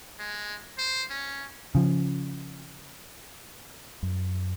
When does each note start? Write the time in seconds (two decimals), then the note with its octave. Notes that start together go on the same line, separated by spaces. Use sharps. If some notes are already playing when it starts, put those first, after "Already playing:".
0.19 G#3
0.78 C5
1.10 C#4
1.75 C#3 F3
4.03 F#2